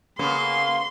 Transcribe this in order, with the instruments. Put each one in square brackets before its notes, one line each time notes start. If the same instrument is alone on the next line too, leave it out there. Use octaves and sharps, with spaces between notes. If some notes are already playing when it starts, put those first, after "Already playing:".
[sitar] C#3 A#3 B3 [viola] C6